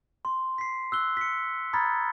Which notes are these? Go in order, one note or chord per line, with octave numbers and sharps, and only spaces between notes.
C6
B6 C7
E6 F#6 G7
B6 C#7
A#5 B5 D#6 F6 G#6 A6